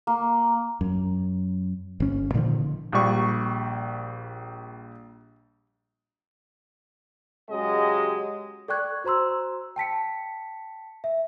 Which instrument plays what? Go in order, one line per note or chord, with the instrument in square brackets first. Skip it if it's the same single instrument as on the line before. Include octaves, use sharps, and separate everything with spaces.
[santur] A#3
[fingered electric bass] F#2
G1 C#4
A#2 D3 D#3 F3
[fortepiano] A#1 G3 C#6
[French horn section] C#3 F#3 G#3 G4 D#5
[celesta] A4 D5 G5 C#6 F#6 G#6
F#4 C5 A#5 C6 E6
G5 A5 B6 C#7
E5